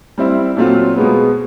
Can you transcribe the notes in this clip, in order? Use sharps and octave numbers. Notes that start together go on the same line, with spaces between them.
G3 C4 E4
A#2 F#3 A3 C4 F4
B2 G#3 B3